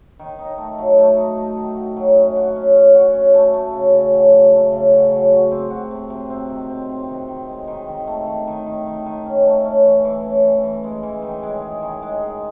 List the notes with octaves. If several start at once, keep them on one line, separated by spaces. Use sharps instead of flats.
D#3
D#4
A3
F#3
A3
D#4
A3
D#3
F#4
F#3
C#4
F#4
C#4
C#4
F#4
C#4
A3
A3
C#3
C#3
F#3
F#3
A3
C#3
F#4
F#3
F#4
C4
F#4
C3
C3
C4
D#3
C4
C4
D#3
D#3
G#3
D#3
D#3
A3
D#3
D#3
D#3
D#3
D#3
C#4
A3
C#4
E3
E3
C#4
E3
E3
G#3
E3
D#3
G#3
G#4
D#3
G#3
G#4